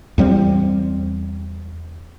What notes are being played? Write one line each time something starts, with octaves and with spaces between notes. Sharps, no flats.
E2 G2 G3 C4